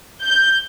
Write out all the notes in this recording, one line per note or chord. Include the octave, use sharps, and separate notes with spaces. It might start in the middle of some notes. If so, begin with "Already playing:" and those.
G6